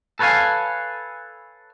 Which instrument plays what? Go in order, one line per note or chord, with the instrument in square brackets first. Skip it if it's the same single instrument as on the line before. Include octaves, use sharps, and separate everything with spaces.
[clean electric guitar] A4 B4 C#5 D#5 F5 G#5